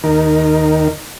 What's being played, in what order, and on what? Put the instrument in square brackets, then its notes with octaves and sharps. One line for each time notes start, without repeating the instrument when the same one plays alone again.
[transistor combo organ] D#2 D#4 A#4